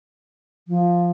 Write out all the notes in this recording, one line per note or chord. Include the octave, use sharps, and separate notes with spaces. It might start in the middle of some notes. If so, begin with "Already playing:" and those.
F3